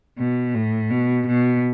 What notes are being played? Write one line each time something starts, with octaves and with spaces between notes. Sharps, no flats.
B2
A2
B2
B2